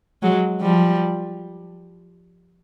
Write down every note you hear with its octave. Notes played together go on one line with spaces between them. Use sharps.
F#3 G#3
F3 G3